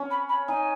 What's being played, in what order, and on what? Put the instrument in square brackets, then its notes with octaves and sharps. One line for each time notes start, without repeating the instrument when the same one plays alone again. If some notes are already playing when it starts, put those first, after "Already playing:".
Already playing: [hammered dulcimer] C#4
[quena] B5
B5
[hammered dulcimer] D#4 [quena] G#5